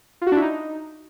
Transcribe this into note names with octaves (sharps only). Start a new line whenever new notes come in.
F4
F#4
D4
E4
D#4